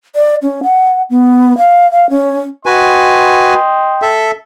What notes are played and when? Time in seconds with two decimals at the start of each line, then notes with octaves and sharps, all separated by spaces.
0.16 D5
0.43 C#4
0.63 F#5
1.10 B3
1.58 F5
1.92 F5
2.10 C#4
2.66 F#4 B4 D#5 G5 G#5 C6
4.02 A4 E5